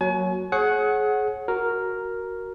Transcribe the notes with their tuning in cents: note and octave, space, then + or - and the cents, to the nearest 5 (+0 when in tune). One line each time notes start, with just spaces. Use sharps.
F#3 +0 A#3 +0 G#5 +40
G#4 +30 C#5 -30 F#5 +0
F#4 +0 A#4 +0